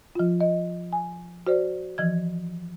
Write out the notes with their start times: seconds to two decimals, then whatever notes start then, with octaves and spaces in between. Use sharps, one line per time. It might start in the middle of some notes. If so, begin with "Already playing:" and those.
0.15 F3 F4
0.41 D#5
0.93 G#5
1.47 F#4 C5 D5
1.98 E3 F3 G#6